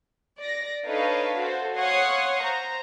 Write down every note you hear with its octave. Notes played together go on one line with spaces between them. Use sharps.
D5 A#6
D4 D#4 A4 B4 C#5 F5
F#4 A4 C5
C#5 F5 F#5 C6 C#6 D#6
C5 A#5